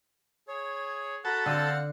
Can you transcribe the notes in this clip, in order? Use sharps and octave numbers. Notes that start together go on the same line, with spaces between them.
G#4 C#5
F#4 A4 F#5 A#5 B5
D3 C4 F5 F#5